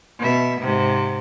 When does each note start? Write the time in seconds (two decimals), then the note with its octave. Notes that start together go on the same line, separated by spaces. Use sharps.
0.19 B2 E5
0.60 G#2 C3